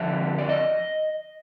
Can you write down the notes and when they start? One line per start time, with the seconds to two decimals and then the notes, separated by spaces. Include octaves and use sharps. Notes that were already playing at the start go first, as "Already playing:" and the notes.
Already playing: F2 D3 F3 E5
0.38 D5
0.49 D#5